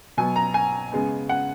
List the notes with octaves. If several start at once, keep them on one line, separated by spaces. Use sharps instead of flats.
B2 F#3 B3 G#5
A#5
G#5
C#3 G#3 B3
F#5